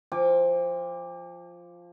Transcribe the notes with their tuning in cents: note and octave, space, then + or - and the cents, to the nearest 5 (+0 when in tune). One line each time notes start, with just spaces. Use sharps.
F3 +0 G5 +40 D6 +0